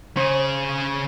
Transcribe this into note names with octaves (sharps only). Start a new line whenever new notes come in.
C#3 G#4 C5